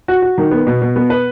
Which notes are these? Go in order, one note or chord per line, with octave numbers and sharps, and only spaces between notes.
F#4
F#4
D#3
B3
B2
B2
B3
B4